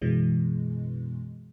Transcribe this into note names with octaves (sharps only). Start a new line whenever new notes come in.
F#2 B2 E3 G#3